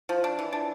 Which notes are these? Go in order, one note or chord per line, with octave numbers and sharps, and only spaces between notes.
F3
D4
E3
D4